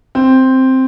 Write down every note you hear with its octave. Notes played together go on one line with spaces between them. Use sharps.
C4